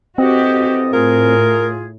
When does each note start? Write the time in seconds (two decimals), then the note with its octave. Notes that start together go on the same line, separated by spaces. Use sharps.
0.18 E3 C4 F#4 G4 A4 D#5
0.93 A2 F4 G#4 A#4